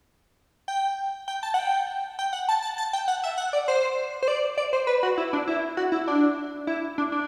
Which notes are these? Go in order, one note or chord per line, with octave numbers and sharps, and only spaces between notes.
G5
G5
A5
F#5
G5
G5
F#5
A5
A5
A5
G5
F#5
E5
F#5
D5
C5
C5
D5
D5
C5
B4
F#4
E4
D4
E4
F#4
E4
D4
E4
D4
D4